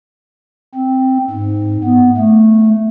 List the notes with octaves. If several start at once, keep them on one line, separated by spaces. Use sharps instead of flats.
C4
G#2
B3
A3